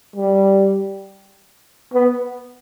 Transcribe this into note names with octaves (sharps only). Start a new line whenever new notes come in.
G3
B3